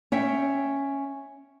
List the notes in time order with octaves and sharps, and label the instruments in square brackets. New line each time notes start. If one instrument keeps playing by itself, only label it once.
[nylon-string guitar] C#4 E5 G5